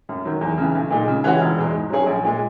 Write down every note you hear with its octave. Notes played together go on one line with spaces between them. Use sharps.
F#2
D#3 F#3
E2
C#3 E3
B1
A#2 G#3 D#4
C#3
E3 G#3 C#4 F#4
E1
E2 B2 G#3
G#2
F#3 C#4 G#4 C#5
A#1
A#2 G#3